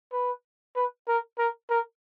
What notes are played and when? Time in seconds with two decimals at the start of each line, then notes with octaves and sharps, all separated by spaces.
0.12 B4
0.76 B4
1.08 A#4
1.38 A#4
1.70 A#4